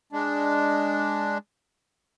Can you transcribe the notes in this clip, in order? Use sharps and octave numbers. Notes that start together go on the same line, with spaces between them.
G#3 D4